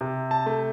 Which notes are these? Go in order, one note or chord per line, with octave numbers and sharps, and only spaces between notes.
C3
A5
A3